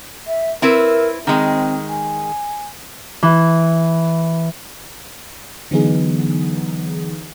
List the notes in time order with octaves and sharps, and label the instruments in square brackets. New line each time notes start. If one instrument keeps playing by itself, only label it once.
[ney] E5
[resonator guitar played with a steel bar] C4 E4 B4 [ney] A#4
[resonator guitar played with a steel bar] D#3 G#3 [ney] C4
[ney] G#5
[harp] E3
[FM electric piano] D3 E3 F#3 B3 D#4 G#4